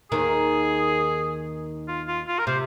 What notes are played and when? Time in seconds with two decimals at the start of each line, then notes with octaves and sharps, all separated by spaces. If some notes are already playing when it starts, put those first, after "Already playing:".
0.11 D#2 D#3 G#4
1.88 F4
2.07 F4
2.28 F4
2.39 A#4
2.47 C3 C5